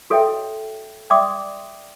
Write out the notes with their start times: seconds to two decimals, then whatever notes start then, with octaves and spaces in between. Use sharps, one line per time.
0.10 F#4 A4 C#5 D#5 E5 G5
1.10 D5 E5 G5 C6 D6 D#6